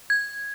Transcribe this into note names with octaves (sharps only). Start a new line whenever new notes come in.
G#6